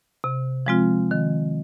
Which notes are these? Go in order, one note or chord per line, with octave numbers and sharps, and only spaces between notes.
C3
F3 G#3 C4 F4
D#3